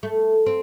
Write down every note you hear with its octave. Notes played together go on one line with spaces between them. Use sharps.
A3
C4